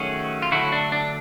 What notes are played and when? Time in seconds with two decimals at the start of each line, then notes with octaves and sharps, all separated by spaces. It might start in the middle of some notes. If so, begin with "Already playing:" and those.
Already playing: D#3 F#3 A3 C#4 F#4 G#4
0.42 F4
0.51 D3 F#3 A3 E4 F#4
0.72 D4
0.92 D4